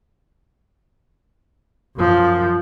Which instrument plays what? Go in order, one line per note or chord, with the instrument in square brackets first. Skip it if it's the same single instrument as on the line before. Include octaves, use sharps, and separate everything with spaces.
[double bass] F#2 F3